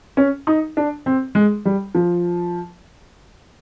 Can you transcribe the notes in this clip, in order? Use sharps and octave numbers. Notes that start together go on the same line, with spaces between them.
C#4
D#4
D4
C4
G#3
G3
F3